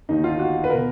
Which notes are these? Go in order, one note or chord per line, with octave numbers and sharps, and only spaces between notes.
D#2 D#3 D#4
F4
F#4
B4
B2 A#4